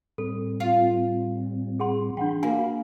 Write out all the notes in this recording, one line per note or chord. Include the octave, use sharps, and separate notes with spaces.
A2 G3 C4 A4
F4
G#4 F#5 C6
E3 D4 F#5 G5 B5 C6
A#3 F#4 A#4 F5 G#5 B5